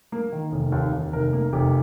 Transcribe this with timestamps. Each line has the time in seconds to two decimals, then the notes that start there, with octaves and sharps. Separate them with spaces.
0.12 A#3
0.32 D#3
0.52 F1
0.72 D#2
0.92 D#2
1.13 F1 A#4
1.33 A#3
1.53 F1 G4